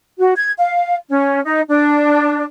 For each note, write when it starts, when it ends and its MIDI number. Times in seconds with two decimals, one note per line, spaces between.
0.19 0.33 66
0.36 0.51 92
0.58 0.95 77
1.10 1.40 61
1.44 1.61 63
1.68 2.44 62